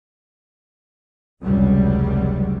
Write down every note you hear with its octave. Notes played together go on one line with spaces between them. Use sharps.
F1 C#2 C3 F#3 G3